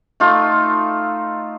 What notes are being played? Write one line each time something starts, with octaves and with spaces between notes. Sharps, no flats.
A3 D#4 F4 A4